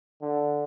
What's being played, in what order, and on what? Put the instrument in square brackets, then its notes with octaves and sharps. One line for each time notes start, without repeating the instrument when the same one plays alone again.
[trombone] D3